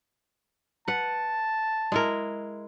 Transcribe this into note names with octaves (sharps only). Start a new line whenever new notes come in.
B4 F#5 A5
G#3 E4 A#4